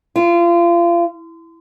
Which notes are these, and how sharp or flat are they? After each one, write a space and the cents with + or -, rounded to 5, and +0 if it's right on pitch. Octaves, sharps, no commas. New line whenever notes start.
F4 -30